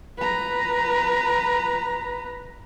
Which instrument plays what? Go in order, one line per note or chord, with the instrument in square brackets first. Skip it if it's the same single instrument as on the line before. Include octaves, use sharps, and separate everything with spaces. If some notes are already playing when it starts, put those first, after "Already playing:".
[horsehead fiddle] B4 A#5